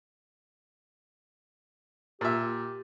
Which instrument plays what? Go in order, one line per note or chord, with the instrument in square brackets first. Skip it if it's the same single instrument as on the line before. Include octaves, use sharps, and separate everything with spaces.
[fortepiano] A#2 E5 [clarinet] G4